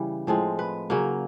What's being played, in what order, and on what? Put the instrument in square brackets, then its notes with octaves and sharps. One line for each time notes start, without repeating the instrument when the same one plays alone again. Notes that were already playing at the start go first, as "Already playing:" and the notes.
Already playing: [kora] C#3 E3 G3
A2 F3 G#3 C4
B4
C#3 F#3 A#3